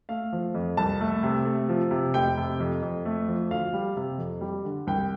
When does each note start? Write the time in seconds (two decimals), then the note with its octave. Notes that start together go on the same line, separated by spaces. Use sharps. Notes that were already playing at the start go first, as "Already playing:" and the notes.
0.09 A3 F5
0.33 F3
0.54 F2
0.77 C2 A5
1.01 A3
1.23 C3
1.45 A3
1.69 F3
1.91 C3
2.14 F1 G5
2.37 C3
2.60 F2
2.82 F2
3.05 A3
3.28 F3
3.50 D2 F5
3.73 G3
3.96 C3
4.18 F2
4.41 G3
4.65 D3
4.87 C2 G5